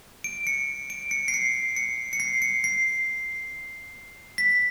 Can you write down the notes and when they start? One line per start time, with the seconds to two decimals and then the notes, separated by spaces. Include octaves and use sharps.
0.24 D7
0.47 C#7
0.90 D7
1.11 C#7
1.28 C7
1.34 C#7
1.76 C#7
2.13 C#7
2.20 C7
2.42 C#7
2.64 C7
4.38 B6